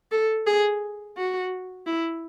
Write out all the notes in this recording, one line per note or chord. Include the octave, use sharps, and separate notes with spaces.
A4
G#4
F#4
E4